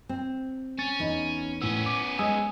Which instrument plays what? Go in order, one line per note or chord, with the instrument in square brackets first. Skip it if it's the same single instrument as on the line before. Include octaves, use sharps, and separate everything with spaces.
[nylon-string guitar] C4
[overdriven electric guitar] C#4 [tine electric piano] A6
[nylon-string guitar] E2 D#4
[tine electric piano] A2 E6 [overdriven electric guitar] B3 C#4
[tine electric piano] D6
[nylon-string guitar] G#3 [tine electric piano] G#5 D#6 E6